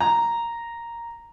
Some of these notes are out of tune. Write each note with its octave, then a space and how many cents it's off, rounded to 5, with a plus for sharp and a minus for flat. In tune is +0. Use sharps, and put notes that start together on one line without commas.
A#5 +0